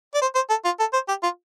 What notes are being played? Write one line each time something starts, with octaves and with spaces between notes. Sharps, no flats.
D5
C5
C5
A4
F4
A4
C5
G4
F4